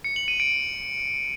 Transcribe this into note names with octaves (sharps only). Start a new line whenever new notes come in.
C#7
F#7
D#7
D7